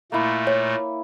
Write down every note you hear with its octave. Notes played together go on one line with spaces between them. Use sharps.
A#2 A3 A#3 E4
C#5